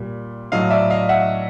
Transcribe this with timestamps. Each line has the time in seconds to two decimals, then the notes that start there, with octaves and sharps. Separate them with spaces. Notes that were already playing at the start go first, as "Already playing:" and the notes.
Already playing: A#2 G3
0.52 A2 F#3 D#5 F5
0.70 D5 E5
0.90 D#5 F5
1.09 E5 F#5